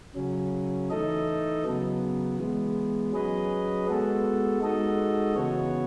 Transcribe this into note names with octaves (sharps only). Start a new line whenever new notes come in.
C#3 F#3 C#4
E3 A3 D#4 A4 D#5
C#3 F#3 B3
E3 G#3 B3
F#3 C#4 G#4 B4 D#5
G#3 B3 F#4 A4
G#3 D#4 F#4 A4 D#5
C#3 E3 B3 F#4 C#5